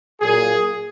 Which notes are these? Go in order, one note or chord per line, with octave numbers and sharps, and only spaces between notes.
A#2 F#3 A#3 G#4